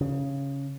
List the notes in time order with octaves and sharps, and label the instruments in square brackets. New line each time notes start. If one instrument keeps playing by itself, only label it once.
[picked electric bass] C#3